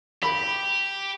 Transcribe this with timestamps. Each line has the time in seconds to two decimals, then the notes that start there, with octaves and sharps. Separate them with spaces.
0.23 G4 B5